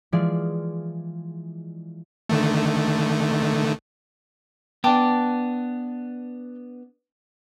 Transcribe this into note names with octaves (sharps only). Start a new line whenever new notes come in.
E3 F3 G#3 F4 G#4 D5
D3 D#3 A3
B3 D4 G5 A5 D6